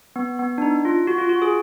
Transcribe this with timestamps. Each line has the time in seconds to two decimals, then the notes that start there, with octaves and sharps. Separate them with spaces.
0.16 B3
0.39 B3
0.58 D4
0.62 D#4
0.85 F4
1.07 F#4
1.18 F4
1.29 F#4
1.42 G#4